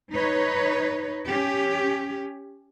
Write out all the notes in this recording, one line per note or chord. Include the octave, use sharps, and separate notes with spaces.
D#4 B4 C#5
C#4 G4